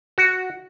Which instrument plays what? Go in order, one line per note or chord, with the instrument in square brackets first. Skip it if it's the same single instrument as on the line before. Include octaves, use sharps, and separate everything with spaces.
[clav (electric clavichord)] F#4